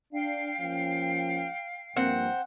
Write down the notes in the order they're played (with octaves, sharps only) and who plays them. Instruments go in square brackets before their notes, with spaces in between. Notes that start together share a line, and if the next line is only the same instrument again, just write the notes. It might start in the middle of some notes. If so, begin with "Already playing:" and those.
[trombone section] D4 [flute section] F5 G5
[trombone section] F3 A#3 C#4
[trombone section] G2 F3 A#3 [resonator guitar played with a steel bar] C4 [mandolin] F#5